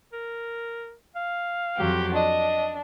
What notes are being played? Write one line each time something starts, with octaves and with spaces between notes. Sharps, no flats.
A#4
F5
F2 F#3 G4
D4 D#5